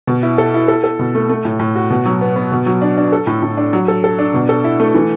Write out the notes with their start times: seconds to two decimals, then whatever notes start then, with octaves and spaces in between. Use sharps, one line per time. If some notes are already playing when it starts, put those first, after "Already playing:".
0.07 B2
0.23 E4
0.38 A4
0.54 E4
0.68 A4
0.84 A4
0.99 B2
1.15 A3
1.29 A3
1.45 A2
1.59 A2
1.76 F#4
1.90 B2
2.06 F#3
2.21 B3
2.36 B3
2.52 B2
2.66 F#3
2.82 D4
2.98 D4
3.12 A4
3.27 A2
3.43 A2
3.57 D4
3.73 F#3
3.88 A4
4.04 A4
4.19 D4
4.34 B2
4.49 A4
4.64 E4
4.80 A3
4.95 E3